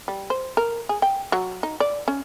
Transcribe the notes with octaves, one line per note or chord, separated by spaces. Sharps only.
G3
C5
A#4
G#4
G5
F#3
D#4
D5
C#4